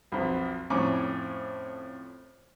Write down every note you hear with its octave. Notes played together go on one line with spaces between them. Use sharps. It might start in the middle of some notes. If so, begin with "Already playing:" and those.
B1 F2
F2 A2 C#4 G#5 C#6 D6